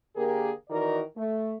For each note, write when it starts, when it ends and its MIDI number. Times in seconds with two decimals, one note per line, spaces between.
0.16 0.51 50
0.16 0.51 58
0.16 0.51 67
0.16 0.51 68
0.16 0.51 70
0.70 1.02 51
0.70 1.02 52
0.70 1.02 63
0.70 1.02 66
0.70 1.02 70
0.70 1.02 74
1.17 1.54 57